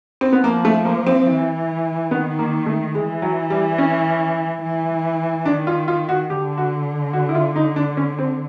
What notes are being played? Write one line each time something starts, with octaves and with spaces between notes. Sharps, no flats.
C4
B3
F3 A#3
A3
A#3
C4
E3
D#3 B3
A#3
A3
E3 G#3
F#3
G3
C#4
E3
D#3 D4
F4
F4
F#4
D3 G4
F#4
F#4
E4
F4
D#4
D4
C#4
C4